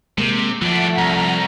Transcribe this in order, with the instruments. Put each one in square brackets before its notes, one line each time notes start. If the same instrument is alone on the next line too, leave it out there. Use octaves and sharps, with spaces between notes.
[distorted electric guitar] C3 [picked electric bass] G#3 A#3
[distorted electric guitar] E3 D4 [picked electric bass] F3 [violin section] A3 F#5 B6
[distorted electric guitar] C2 [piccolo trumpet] A#5